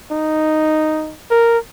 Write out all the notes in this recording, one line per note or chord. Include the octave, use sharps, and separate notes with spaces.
D#4
A#4